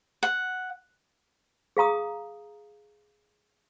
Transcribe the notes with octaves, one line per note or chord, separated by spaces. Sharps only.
F#5
G#4 F5 A#5 D#6